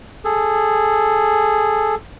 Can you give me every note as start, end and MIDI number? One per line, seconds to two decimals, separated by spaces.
0.25 1.95 68
0.25 1.95 69